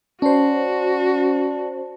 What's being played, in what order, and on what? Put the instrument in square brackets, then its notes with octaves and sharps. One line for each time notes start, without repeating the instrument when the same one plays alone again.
[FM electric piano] C#4 C5 [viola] F#4 [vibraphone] D5 A5